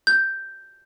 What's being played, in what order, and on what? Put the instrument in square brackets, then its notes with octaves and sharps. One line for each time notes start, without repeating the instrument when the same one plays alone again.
[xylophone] G6